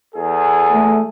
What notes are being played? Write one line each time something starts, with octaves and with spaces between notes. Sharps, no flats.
E2 G#4 A4
A3